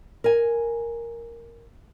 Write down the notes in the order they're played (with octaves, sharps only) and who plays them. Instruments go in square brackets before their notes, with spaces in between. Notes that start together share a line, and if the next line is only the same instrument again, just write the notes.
[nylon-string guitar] A#4 G#5